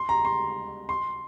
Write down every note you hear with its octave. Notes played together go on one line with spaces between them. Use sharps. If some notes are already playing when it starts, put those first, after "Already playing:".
Already playing: C6
A#5
C6
C6